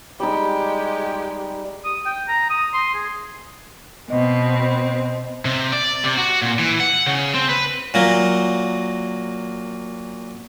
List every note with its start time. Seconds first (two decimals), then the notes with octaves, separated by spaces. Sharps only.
0.20 G3 G#3 D#4 G4
1.84 D#6
2.06 G5
2.28 A#5
2.50 D#6
2.74 C6
2.94 G#4
4.10 B2 C4 D#5
5.45 C3
5.73 D5
6.04 C3
6.18 F#4
6.42 A#2
6.59 E3
6.80 F#5
7.06 C#3
7.34 C4
7.49 B4
7.94 A#2 F#3 A#3